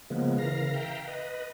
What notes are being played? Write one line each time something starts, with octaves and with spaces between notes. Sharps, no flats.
C#3 F3 G#3 A#3 B3
C#3 E3 A#4 F5 A#6
E5 F5 G5 A#5
B4 D#5